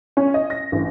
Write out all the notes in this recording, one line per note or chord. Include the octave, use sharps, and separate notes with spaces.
C#4
D#5
A#6
A1